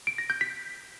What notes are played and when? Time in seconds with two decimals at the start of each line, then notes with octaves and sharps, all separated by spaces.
0.07 D7
0.18 A#6
0.30 G6
0.41 B6